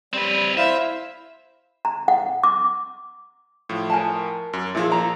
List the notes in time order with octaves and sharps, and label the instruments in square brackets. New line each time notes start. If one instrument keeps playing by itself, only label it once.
[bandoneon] G3 [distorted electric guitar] C4 B4
[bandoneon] E4 C5 F5 [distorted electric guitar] E5
[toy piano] A#5
F#5
D6
[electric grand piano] A2 F3
[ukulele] A#4 G#5 A5
[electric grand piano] F#2
[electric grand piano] A#2 F3 [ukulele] E4 F#4 G#4
[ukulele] A#5